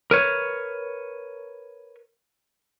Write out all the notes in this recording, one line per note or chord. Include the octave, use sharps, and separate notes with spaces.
A#4 B4 C#5